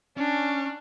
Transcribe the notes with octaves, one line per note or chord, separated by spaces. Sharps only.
C#4 D4